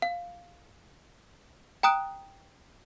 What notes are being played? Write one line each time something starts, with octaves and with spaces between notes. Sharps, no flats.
F5
G5 A#5 D#6 F#6 D7